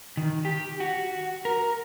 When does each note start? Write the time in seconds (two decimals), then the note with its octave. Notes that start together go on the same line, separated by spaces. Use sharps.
0.17 D#3
0.45 G4
0.80 F#4
1.45 A#4